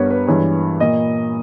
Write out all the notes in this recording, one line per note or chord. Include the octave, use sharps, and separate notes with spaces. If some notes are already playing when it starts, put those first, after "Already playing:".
Already playing: G2 G3 B3 A#4 B4 C#5
B4
G2 E3 G#3 C#5
A#2 A#3 D#5